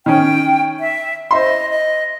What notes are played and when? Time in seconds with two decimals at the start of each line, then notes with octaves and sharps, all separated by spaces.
0.06 D#3 C#4 G5
0.80 E5
1.31 C5 D#5 E5 C6
1.69 D#5